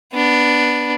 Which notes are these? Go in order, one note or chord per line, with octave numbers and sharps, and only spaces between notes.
B3 D4